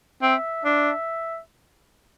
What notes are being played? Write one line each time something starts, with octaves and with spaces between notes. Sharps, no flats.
C4 E5
D4 E5